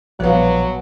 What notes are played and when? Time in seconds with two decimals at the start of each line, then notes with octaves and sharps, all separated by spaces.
0.20 A#1 B2 F#3 G3 B4 D5 F5